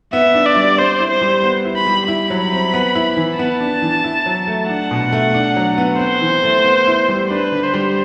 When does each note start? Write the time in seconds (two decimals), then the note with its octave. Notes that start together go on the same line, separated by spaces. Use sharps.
0.13 B3 E5
0.34 D4
0.46 D5
0.56 G3
0.78 C4 C5
1.00 E4
1.11 C5
1.22 G3
1.43 B3
1.65 E4
1.76 B5
1.87 G3
2.08 E4 B5
2.30 F#3
2.52 C4
2.74 B3
2.95 E4
3.17 E3
3.39 B3 A5
3.61 D4
3.82 E3
4.04 E4
4.26 F#3
4.47 A3
4.69 D4 F#5
4.91 B2
5.13 A3
5.34 D4
5.56 F#3
5.78 B3
5.99 C4 C5
6.21 E3
6.43 A3
6.65 B3
6.87 E4
7.09 G3
7.30 D4 B4
7.52 D3
7.63 C5
7.74 G3